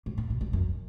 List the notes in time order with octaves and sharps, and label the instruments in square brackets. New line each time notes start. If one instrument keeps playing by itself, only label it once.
[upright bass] G#2
A2
A2
G#2
F#2